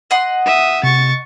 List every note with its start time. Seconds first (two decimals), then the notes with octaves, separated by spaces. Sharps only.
0.11 D#5 F#5 C6
0.46 E5 D#6
0.83 C3 C#6 A6